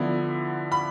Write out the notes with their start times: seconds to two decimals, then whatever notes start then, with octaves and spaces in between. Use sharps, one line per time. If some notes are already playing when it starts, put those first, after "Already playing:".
Already playing: D3 F3 B3 E4
0.72 B5